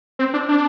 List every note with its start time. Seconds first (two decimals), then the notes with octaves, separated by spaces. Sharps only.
0.19 C4
0.34 D4
0.49 D4